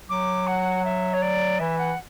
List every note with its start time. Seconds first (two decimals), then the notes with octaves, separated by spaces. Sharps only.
0.10 F#3 D6
0.47 F#5
0.85 E5
1.14 C#5
1.22 D5
1.59 E3 E5
1.78 F#5